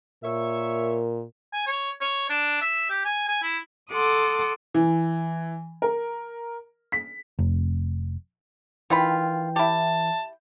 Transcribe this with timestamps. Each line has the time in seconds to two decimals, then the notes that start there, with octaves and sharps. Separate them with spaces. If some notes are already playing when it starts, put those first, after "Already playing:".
0.23 A#2 A#4 C#5 E5
1.53 G#5
1.67 C#5
2.01 C#5
2.29 D4
2.62 E5
2.90 G4
3.05 G#5
3.28 G#5
3.43 E4
3.91 A4 F#5 C6 D6 D#6
4.74 E3
5.82 A#4
6.92 B6
7.39 F1
8.90 D#3 E3 F4 G5 B5
9.56 E4 G4 A5